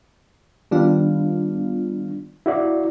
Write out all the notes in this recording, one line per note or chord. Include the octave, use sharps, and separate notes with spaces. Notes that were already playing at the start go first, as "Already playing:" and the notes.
D#3 G3 B3 D4 F4
E4 F#4 D5